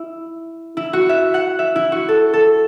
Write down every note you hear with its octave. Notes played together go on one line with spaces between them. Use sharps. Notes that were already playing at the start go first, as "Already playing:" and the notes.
Already playing: E4
E4
F#4
E5
F#5
E5
E4
F#4
A4
A4